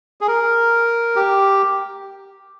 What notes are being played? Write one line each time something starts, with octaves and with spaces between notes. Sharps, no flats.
G#4
A#4
G4